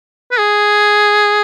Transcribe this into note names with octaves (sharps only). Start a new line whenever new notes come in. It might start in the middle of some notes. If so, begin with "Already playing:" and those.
B4
G#4